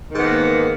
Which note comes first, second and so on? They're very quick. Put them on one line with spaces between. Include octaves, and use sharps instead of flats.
D#3 G#2 B3 A#3